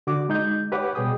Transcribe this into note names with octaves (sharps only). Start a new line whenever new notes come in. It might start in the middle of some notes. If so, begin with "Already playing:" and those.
D3 F#4 D6
G#3 D#4 G6
G4 B4 C#5 F#5 D6
B2 G3 G#4 G5 D#6